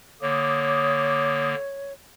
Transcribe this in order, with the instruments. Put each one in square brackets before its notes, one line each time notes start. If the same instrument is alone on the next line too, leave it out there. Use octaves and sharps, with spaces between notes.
[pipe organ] D3 A#3 [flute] C#5 [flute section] D6 D#6